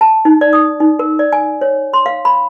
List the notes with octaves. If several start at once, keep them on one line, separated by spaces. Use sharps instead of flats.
A5
D#4
D5
D#6
D#4
A#4
D5
G#5
C#5
C6
F5
B5